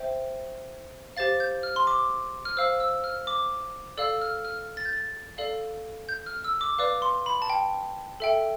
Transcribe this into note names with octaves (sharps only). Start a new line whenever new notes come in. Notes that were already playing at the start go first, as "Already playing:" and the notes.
Already playing: C5 E5 G5
G4 C5 F5 A6
G6
F6
C6
D6
F6
C5 F5 E6
E6
F6
D6
A4 D5 F5 E6
F6
F6
A6
G6
A6
A4 D5 F5
G6
F6
E6
D6
B4 D5 F5 D6
C6
B5
A5
G5
A4 E5 G5